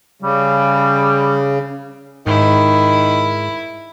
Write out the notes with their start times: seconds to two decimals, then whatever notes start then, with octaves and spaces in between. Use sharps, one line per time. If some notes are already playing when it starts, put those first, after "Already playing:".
0.22 C#3 G3
2.27 G#2 D#3 E4